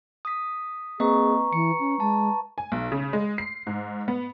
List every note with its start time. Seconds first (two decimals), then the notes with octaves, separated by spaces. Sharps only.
0.25 D#6 B6
1.00 A#3 C4 G#4 B4 D#5 A#5 C#6
1.53 E3 C#7
1.80 C#4
2.00 G#3 A5
2.58 G#5
2.72 B1
2.92 C#3
3.13 G#3
3.38 C7
3.67 G#2
4.08 B3